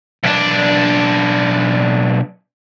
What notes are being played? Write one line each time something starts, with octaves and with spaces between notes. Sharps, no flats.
B1 D4